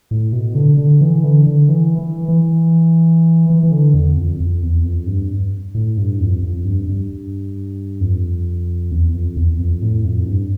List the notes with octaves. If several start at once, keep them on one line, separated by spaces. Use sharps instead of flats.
A2
B2
D3
D3
E3
D3
D3
E3
E3
E3
E3
E3
D3
E2
F2
F2
E2
F2
G2
A2
G2
F2
F2
G2
G2
F2
E2
F2
E2
F2
A2
F2
G2